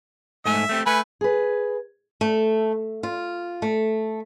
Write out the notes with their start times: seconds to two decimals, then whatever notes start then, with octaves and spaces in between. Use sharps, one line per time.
0.45 G#2 A3 E5 G#5
0.69 A3 C4 G4
0.86 A3 B4 G#5
1.21 G#4 B4
2.21 A3
3.03 F4
3.62 A3